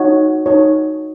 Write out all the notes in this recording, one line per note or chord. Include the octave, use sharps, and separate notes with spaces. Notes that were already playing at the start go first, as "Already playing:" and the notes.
Already playing: D#4 F#4 C#5
D#4 F#4 C#5